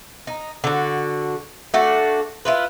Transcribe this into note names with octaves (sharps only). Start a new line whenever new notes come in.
D#4
D3 F#4
A3 D4 F#4
E4 F4 B4